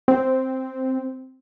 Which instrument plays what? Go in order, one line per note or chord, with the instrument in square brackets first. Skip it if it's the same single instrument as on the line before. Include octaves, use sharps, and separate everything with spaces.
[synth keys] C4